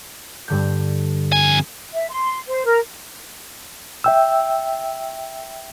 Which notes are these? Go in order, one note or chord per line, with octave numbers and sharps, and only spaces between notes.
G2 D3 G6
F2 G#5
E5
C6
C5
A#4
E5 G5 E6